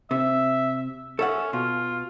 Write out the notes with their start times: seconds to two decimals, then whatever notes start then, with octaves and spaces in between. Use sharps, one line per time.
0.11 C3 E5
1.19 C#4 A4 E5 F#5
1.53 B2 F4